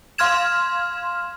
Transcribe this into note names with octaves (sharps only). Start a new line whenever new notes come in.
F5 C6 F6 G#6 E7